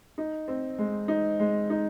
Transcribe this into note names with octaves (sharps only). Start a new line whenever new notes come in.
D#4
C4
G#3
D#4
G#3
D#4